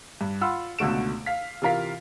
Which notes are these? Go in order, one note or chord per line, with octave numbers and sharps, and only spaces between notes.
G2
F4 F#5 B5 C6 E6
C#2 B2 D3 A3 D7 E7
F5 B6
C3 E3 F4 A#4 F5 B6